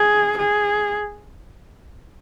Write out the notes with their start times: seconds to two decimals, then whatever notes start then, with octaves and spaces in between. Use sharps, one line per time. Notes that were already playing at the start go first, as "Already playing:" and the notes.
Already playing: G#4
0.38 G#4